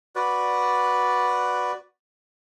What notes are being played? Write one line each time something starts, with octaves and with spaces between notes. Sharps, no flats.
F#4 B4 D5